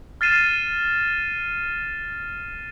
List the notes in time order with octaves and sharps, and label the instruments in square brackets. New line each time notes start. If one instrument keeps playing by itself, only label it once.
[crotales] F6 A6 C7 D#7 E7